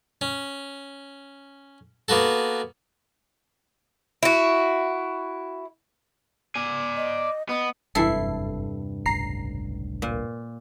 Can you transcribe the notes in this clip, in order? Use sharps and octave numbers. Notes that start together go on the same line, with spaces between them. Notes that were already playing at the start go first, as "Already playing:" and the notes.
C#4
A#3 B3 F#4 A4
E4 F#4
D5 G#5
D#5
B3 D#5
F#1 E2 G2 C3 E3 E4 A4 C7
G1 C#2 A2 A#5 C7
A#2